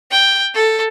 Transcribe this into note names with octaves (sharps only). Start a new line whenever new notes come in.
G5
A4